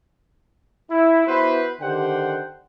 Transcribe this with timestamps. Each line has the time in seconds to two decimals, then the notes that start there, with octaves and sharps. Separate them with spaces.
0.91 E4
1.27 B3 E4 F#4 B4 C5
1.81 D3 D#3 G4 C5 F#5 G5